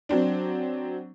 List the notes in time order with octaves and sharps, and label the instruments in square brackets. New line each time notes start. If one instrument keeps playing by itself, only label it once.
[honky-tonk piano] F#3 C4 D4